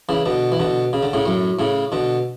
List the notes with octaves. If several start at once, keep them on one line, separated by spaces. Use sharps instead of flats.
C#3 E3
B2 D3
E3
B2 D3
C#3
D3
A2 C#3
F#2 A2
A2 C#3
B2 D3